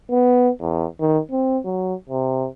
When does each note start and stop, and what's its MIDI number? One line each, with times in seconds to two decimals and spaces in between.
0.11 0.50 59
0.61 0.86 40
1.00 1.19 51
1.31 1.58 60
1.65 1.94 54
2.10 2.47 48